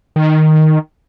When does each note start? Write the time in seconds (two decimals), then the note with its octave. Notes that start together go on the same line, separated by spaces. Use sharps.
0.16 D#3